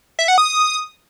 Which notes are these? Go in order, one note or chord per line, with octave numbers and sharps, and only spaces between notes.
E5
F#5
D#6